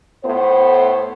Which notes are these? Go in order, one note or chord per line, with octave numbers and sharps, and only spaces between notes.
A2 B3 C5